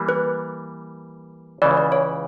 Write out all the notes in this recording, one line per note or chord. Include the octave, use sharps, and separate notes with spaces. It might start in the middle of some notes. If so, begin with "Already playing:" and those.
Already playing: E3 G3 A#3
B4
C#2 C#3 E3 D5
D5
C#5